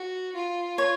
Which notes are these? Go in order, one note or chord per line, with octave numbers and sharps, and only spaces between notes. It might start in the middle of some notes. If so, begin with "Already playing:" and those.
Already playing: F#4
F4
C#5